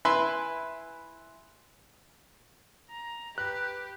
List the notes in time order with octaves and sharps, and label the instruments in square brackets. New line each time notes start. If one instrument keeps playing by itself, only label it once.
[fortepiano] E4 B4 E5 G#5 C6
[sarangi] A#5
[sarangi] G4 [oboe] B4 [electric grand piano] F#6